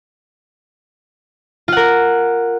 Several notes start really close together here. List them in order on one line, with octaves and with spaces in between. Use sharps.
F4 F#5 A#4